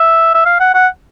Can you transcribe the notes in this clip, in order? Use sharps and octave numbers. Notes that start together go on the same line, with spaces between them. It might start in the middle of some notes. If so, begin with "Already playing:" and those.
Already playing: E5
E5
F5
F#5
F#5